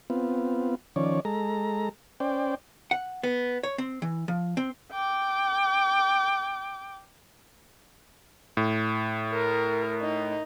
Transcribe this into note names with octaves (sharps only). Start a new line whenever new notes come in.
B3 C4 F4
D#3 F3 C#4 C#5 D5
G#3 A4 A#5
C#4 C5 D5 G5
F#5
B3
C#5
C4
E3
F3
C4
G5 D6
A2
A#4
D#4